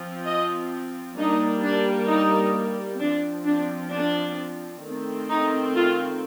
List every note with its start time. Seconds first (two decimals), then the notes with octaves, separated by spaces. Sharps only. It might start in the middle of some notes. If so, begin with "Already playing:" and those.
Already playing: F3 C4
0.25 D#5
1.17 G3 A#3 D4 D#4
1.63 D4
2.09 D#4
3.00 F3 C4 D4
3.46 D4
3.92 D4
4.83 D#3 A3 C4
5.29 D#4
5.75 F4